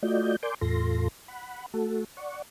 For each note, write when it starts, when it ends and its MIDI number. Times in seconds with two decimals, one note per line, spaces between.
0.03 0.36 57
0.03 0.36 65
0.03 0.36 66
0.03 0.36 74
0.03 0.36 75
0.03 0.36 91
0.43 0.54 70
0.43 0.54 74
0.43 0.54 80
0.43 0.54 84
0.43 0.54 86
0.43 0.54 91
0.61 1.08 40
0.61 1.08 45
0.61 1.08 65
0.61 1.08 69
0.61 1.08 84
0.61 1.08 94
1.28 1.66 78
1.28 1.66 83
1.74 2.04 57
1.74 2.04 66
1.74 2.04 69
2.17 2.42 74
2.17 2.42 78
2.17 2.42 85